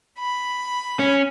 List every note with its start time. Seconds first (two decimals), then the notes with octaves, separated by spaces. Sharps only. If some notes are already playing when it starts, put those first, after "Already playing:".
0.19 B5
0.99 C#4